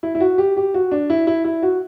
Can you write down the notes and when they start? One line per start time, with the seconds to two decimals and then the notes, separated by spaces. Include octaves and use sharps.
0.03 E4
0.15 E4
0.20 F#4
0.38 G4
0.57 G4
0.74 F#4
0.91 D4
1.10 E4
1.27 E4
1.44 E4
1.63 F#4